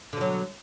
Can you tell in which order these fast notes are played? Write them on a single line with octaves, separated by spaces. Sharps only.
D3 B2 F#3